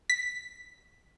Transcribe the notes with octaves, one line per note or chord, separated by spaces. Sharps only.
B6